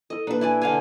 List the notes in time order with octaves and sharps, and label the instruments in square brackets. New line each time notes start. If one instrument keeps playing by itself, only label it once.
[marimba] E4 A4 [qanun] D#5
[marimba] B2 A#3 [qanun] D4 B4
[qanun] E4 D5 G#5
D3 F5 G#5